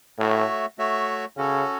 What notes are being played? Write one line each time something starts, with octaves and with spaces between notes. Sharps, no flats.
A2 A3 F#4 C#5 E5
A3 F#4 C#5 E5
C#3 C#4 F#4 A4 C#5